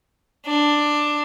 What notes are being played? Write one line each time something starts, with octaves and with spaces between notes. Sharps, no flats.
D4